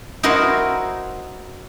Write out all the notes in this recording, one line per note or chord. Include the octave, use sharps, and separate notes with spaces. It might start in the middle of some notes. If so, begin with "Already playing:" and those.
D#4 E4 F#4 A#4 C5